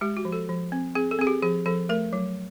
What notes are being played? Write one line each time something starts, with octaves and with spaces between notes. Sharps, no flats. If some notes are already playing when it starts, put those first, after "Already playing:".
G#3 G4
F#4
F3
A4
F3
C4
C4 G#4
A4
C4 G#4
G4
F3 G#4
F3 A4
A3 A#4
F#3